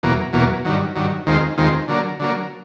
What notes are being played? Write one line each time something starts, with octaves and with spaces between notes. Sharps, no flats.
E2 B2 F#3 A#3
E2 B2 F#3 A#3
G2 D#3 F#3
G2 D#3 F#3
D#2 D#3 G#3 C4 F4
D#2 D#3 G#3 C4 F4
D3 F#3 A#3
D3 F#3 A#3